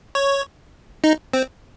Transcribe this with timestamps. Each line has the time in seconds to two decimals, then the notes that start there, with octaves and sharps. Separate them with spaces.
0.15 C#5
1.04 D#4
1.33 C4